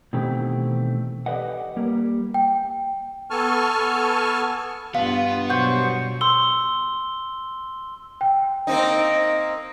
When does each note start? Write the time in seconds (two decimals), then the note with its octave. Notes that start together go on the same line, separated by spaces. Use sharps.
0.13 B2 D#3 E3 A3 C4 G4
1.26 G4 A4 B4 D5 D#5 F#5
1.76 G3 A#3 A#4
2.34 G5
3.30 B3 A4 G#5 A5 C#6 F6
4.95 G2 B3 F4 F5
5.50 B2 F#3 G3 C5 F#5 C#6 G6
6.21 C6 E6 G7
8.21 G5
8.67 A#3 C4 D#4